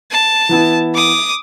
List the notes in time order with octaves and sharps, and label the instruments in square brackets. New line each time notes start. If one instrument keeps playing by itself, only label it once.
[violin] A5
[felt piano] E3 B3 E4
[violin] D6 D#6